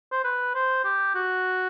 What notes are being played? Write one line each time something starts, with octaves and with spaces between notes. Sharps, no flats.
C5
B4
C5
G4
F#4